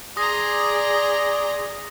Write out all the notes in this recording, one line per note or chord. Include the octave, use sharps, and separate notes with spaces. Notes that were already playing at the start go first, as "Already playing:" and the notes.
G#4 D5 A#5 C6 D#6 A#6